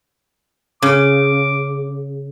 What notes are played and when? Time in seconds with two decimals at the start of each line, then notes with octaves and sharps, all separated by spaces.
0.82 C#3 D6